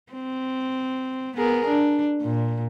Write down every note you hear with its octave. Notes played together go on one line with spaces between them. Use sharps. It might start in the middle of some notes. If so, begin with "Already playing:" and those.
C4
B3 G#4 A#4
D4
A#2